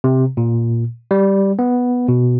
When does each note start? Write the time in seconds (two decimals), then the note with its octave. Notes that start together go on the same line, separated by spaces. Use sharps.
0.04 C3
0.37 A#2
1.11 G3
1.59 B3
2.08 B2